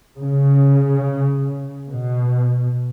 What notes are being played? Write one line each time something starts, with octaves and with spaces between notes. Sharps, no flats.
C#3
B2